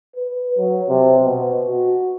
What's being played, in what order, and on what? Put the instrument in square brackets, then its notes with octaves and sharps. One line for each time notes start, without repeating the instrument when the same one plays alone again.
[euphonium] B4
F#3
C3
B2
F#4